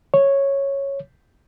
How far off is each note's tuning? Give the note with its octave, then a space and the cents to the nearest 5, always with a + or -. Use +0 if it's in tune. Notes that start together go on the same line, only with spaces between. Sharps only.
C#5 -5